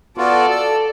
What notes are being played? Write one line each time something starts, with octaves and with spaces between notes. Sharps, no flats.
B3 F4 F#4 A4 D5
E6